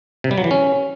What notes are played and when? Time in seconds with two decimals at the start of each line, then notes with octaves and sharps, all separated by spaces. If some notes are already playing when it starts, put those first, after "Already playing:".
0.24 C3
0.31 G3
0.38 F#3
0.44 E3
0.51 C#4